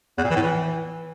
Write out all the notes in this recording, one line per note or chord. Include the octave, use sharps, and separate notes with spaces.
E2
A#2
E3
A2
E3